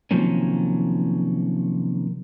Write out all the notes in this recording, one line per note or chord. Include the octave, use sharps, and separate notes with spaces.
C3 D#3 F3 F#3 A#3 C#4